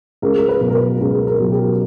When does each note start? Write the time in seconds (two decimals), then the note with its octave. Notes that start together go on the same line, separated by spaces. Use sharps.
0.22 C#2 A#4
0.38 A#4
0.49 B4
0.61 B2 F#3
0.70 A#4
0.75 B4
1.00 C#2 A#4
1.27 A#4
1.39 B2 F#3
1.52 G4